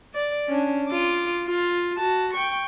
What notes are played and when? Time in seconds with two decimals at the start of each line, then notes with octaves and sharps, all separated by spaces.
0.14 D5
0.48 C#4 D4
0.87 F4 D6
1.48 F4
1.97 F#4 A5
2.34 G5 C#6